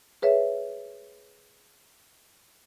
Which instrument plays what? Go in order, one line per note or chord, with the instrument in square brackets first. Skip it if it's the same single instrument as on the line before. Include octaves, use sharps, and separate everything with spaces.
[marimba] G#4 B4 C#5 E5